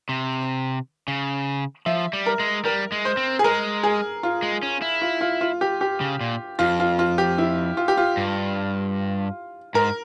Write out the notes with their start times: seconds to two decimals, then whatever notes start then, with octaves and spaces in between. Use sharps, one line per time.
0.09 C3
1.08 C#3
1.86 F3 E5
2.13 G3
2.26 A#4
2.40 G#3
2.65 G3 A#4
2.92 G#3
3.05 C5
3.17 C4
3.39 G#4
3.44 G#3 A#4
3.83 G#4
4.23 F4
4.42 G#3
4.63 C#4
4.82 E4
5.02 F4
5.21 F4
5.41 F4
5.61 G4
5.81 G4
6.01 C#3
6.21 A#2
6.59 F2 F4
6.80 F4
6.99 F4
7.18 G4
7.38 E4
7.77 F4
7.88 G4
7.97 F4
8.17 G2
9.74 G#2 A#4